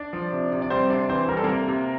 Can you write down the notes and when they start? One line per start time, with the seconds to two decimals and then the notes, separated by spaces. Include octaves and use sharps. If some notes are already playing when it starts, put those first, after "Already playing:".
Already playing: D4 D5
0.13 F3
0.32 C3
0.52 C3
0.62 D5
0.70 G3 C4 C5
0.90 C3 D4 D5
1.09 E3 C4 C5
1.29 G3 A#4
1.37 A4
1.44 C3 A#3 A#4
1.68 C3